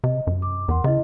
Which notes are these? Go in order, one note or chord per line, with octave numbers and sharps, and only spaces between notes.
C3 D#5
F#2
D6
E2 A#4 F#5 C6
C#3 E4 D#5